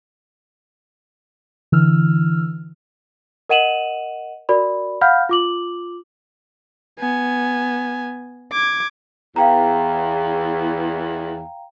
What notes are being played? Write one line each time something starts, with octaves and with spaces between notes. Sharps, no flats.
D3 E3 E6 F6
A#4 D#5 F#5 D#7 E7 F#7
F#4 A#4 D5 B5
F5 F#5 B5 F6 G6
F4 D6 F#7
B3 G#5
D6 G#6
E2 F5 G5 A#5